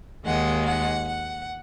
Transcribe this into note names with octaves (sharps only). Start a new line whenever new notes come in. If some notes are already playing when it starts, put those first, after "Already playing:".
D#2 D#3 G#3 F#5
F#5
F#5